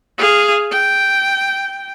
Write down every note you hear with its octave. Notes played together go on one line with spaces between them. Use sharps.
G#4 F5
G5